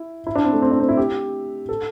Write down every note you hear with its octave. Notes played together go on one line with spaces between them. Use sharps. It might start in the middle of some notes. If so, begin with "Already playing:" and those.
Already playing: E4
E4
D4
C4
A3
C4
D4
C4
E4
G4
A4